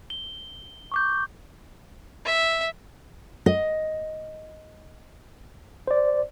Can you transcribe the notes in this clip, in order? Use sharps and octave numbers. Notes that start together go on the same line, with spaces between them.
G7
C#6 D6 G6
E5
D#5
C5 D5